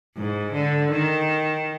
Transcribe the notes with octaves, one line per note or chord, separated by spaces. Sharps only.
G#2
D3
D#3